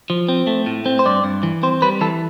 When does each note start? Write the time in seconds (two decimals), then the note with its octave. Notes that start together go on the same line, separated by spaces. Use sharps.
0.10 F3
0.29 C4
0.47 A3
0.66 A2
0.86 C4
0.99 C5
1.06 G2 D5
1.24 G2
1.43 E3
1.63 C4 C5
1.82 G3 B4
2.01 E3 A4